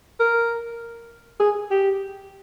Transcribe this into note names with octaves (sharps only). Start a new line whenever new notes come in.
A#4
G#4
G4